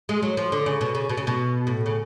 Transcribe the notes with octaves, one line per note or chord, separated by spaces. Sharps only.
G#3
F#3
F3
D3
C#3
B2
C#3
B2
C#3
B2
A2
C#3